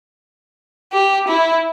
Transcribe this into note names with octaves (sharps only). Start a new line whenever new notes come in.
G4
E4